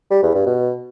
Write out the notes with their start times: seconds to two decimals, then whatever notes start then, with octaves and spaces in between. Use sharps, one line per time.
0.11 G3
0.23 E2
0.34 G2
0.46 B2